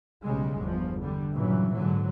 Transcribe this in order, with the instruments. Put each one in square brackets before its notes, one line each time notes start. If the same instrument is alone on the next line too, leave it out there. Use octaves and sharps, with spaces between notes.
[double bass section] B1 C#3 G3 G#3
G1 E2 F3
D3 G3
G2 A#2 C#3 E3 F#3
G#2 D3 F#3